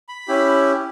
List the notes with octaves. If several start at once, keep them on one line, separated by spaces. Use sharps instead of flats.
B5
C#4 E4 G4